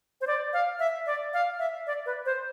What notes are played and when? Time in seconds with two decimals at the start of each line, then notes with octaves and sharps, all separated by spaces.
0.21 C5
0.27 D5
0.53 F5
0.79 E5
1.06 D5
1.34 F5
1.59 E5
1.87 D5
2.06 B4
2.25 C5